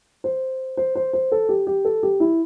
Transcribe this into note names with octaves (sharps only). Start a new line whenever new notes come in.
C5
C5
C5
C5
A4
G4
G4
A4
G4
E4